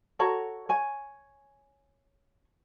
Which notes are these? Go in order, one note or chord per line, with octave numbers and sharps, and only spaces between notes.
F#4 A4 C#5 A#5
C#5 G#5